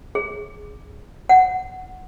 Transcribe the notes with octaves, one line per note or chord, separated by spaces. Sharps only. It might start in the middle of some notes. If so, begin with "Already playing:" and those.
G#4
F#5